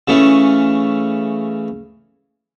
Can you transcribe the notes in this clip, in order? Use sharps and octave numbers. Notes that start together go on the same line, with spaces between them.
C#3 E3 A3 C#4